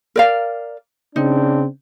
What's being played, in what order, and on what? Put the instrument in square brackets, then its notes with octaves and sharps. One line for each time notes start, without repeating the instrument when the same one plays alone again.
[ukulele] A#4 D5 F5
[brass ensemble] C#3 C4 D4 [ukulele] D#4